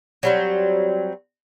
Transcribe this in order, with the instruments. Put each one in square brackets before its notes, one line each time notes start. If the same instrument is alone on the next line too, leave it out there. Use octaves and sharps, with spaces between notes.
[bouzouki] F#3 G3 C4